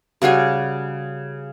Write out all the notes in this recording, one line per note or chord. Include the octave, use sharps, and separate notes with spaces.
C#3 G3 F#4 G#5